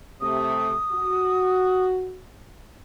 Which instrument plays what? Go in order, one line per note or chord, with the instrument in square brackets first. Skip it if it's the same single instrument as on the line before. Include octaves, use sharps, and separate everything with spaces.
[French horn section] C3 A3 [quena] D#6
[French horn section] F#4